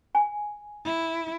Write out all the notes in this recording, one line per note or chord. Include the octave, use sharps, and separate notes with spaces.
G#5
E4